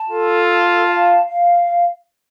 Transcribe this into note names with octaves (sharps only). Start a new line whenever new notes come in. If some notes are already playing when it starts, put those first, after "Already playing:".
Already playing: A5
F4 A4
A5
F5
F5